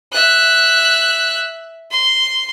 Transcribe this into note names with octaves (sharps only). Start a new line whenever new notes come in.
E5 F#6
C6